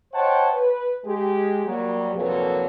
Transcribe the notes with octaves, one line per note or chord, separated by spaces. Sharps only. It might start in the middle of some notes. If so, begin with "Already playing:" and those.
C5 C#5 D#5 F#5 G5 A5
B4
G#3 G4 G#4
F#3 G3 A#3
C2 F2 A#2 F#3 A4 B4